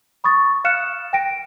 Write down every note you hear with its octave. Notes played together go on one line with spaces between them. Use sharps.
B5 C#6 D#6 A6
F5 F6 F#6 C#7 E7
G5 A#6 D7